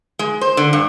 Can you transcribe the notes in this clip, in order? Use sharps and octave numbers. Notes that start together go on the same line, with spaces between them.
G#3
C5
D3
G2